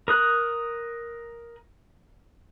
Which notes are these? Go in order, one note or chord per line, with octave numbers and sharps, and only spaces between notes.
A#4 D#6 F#6